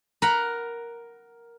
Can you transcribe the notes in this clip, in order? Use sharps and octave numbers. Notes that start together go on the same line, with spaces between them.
A#4 F#5 A#5 B5